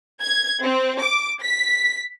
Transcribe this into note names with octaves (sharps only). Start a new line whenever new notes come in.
G#6
C4
D6
B6